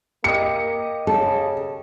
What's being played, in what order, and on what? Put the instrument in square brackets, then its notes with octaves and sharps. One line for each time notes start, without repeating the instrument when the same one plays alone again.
[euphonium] A#3 [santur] G4 D#5 [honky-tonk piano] C#7
[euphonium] C#3 [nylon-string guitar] A4